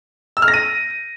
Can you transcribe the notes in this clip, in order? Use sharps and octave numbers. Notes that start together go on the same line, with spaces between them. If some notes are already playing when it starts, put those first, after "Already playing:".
E6
F6
A#6
D#7